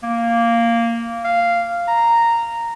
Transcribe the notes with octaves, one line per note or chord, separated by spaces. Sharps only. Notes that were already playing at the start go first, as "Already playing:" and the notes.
A#3
F5
A#5